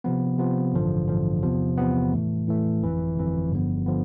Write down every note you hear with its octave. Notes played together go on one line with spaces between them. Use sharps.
C3 F3 B3
C3 F3 B3
A1 G2 D3 F3
A1 G2 D3 F3
E2 C3 F3 B3
E2 C3 F3 B3
A2 E3 A3
A2 E3 A3
G1 F2 E3
G1 F2 E3
G1 G2 D3 F3 B3
D3 F3 B3